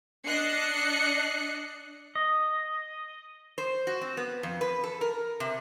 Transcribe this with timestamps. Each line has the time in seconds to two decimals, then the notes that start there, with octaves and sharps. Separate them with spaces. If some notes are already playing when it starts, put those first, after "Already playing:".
0.25 D4 D#5 F#6 C7 C#7
2.15 D#5
3.58 C5
3.87 F#4
4.01 C4
4.17 B3
4.43 F2
4.61 B4
4.84 A4
5.01 A#4
5.40 C3